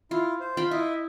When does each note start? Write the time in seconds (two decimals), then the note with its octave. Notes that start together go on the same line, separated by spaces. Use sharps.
0.11 E4 F4
0.40 C5
0.57 F4 G5 B5
0.71 E4 D#5 E5